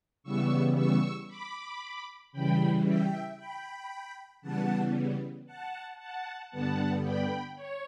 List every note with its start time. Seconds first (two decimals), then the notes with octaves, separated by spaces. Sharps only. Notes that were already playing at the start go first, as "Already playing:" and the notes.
0.23 C#3 E3 G3 B3 C#6 E6
0.75 C#6 E6
1.28 B5 D6
2.33 C#3 E3 G3 G5 B5
2.85 E5 G5
3.37 G5 B5
4.42 C#3 E3 G3 B3 F#5 A5
5.46 F#5 A5
5.99 F#5 A5
6.51 G2 D3 G3 B3 F#5 A5
7.03 G5 B5
7.56 C#5